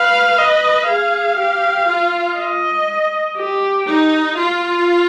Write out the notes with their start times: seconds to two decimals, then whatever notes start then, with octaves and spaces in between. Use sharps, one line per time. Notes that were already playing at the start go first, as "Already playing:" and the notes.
Already playing: B4 F5
0.38 B4 D#5
0.88 G#4 F5
1.38 G4
1.88 F4
2.37 D#5
3.37 G4
3.87 D#4
4.37 F4